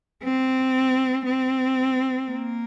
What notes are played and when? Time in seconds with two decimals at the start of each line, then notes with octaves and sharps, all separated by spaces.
0.24 C4
1.26 C4
2.28 A#3